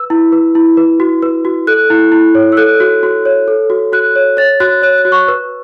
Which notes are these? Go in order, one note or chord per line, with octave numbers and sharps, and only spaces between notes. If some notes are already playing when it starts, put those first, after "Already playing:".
Already playing: B4 E6
E4
B4
E4
B4
F#4
B4
F#4
A4 F#6
E4
E4
C#5
E6
A4 F#6
F#4
F#4
C#5
A4
F#4
F#4 F#6
C#5
C#5 A6
F#4 F#6
C#5 F#6
F#6
F#4
C#6
B4